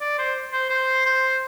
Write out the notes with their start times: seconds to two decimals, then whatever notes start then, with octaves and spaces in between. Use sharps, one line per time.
0.01 D5
0.18 C5
0.52 C5
0.70 C5
1.06 C5